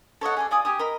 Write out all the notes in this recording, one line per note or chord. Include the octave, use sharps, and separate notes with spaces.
A4 C#5 D#5 F#5
G#4 A4 D5
F4 D5 G#5 D#6
G4 G#5 D#6
A#4 D#5 B5